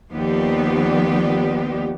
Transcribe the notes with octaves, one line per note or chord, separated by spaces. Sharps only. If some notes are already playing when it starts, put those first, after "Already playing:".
D#2 F3 B3 G4 D5